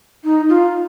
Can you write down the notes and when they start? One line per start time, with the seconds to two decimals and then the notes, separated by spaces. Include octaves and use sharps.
0.24 D#4
0.49 F4